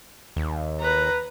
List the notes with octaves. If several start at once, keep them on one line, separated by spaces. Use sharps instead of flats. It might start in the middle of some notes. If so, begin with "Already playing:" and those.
D#2
B4 A#5